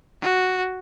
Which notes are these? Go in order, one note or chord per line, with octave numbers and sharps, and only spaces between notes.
F#4